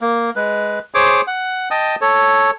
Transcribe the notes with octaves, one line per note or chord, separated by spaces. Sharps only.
A#3
G#3 B4
G#4 C5 C#5 D6
F#5
D#5 G5 A5 D#6
A4 C#5